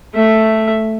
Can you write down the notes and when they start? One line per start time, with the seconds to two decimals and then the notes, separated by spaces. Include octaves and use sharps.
0.14 A3 E5